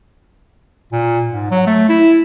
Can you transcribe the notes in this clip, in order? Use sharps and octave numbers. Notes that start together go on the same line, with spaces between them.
A#2
G#2
F#3
A3
E4